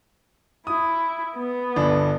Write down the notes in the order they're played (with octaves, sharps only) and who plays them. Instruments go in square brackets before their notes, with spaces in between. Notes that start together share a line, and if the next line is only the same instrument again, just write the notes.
[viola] E4 [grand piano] D#6
[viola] B3
[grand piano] G1 D4